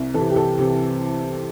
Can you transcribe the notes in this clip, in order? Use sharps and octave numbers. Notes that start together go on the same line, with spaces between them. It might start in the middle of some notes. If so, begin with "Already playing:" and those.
Already playing: C2
C3 E3 A4
G4
C2 A4
C3 E3